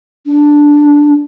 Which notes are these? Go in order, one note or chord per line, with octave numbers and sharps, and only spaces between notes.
D4